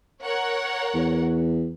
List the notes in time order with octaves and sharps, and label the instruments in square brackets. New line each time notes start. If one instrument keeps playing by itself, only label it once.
[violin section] A#4 C#5 F#5
[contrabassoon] E2